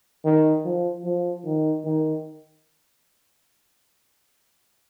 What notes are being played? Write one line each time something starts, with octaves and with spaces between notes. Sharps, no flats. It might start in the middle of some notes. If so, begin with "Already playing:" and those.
D#3
F3
F3
D#3
D#3